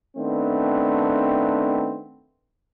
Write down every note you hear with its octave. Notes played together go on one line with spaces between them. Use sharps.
D#3 A3 B3 C4 D4